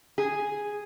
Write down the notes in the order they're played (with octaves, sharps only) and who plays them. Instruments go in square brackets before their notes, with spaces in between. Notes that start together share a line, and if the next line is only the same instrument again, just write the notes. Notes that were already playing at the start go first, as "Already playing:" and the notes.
[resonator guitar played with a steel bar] G#4